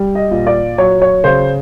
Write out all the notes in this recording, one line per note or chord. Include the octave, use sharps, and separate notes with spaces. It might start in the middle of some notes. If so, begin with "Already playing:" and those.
Already playing: G3
D#5
A#2
D5
F#3 C#5
C#5
C#3 C5